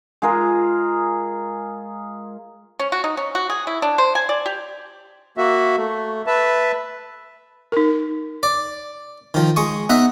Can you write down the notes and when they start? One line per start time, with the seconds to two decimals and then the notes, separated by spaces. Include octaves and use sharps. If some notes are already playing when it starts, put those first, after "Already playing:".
0.22 G#3 F4 G#4 A#4
2.79 C#4
2.92 F#4
3.04 D#4
3.17 C#4
3.35 F#4
3.50 G#4
3.67 E4
3.82 D4
3.98 C5
4.15 G#5
4.29 D5
4.46 G4
5.38 A#3 F#4 E5
5.77 A3
6.27 B4 E5 A5
7.72 D#4 A#4
8.43 D5
9.34 D#3 F3
9.56 G#3 C#6 D#6
9.89 B3 D#4 D#5 E5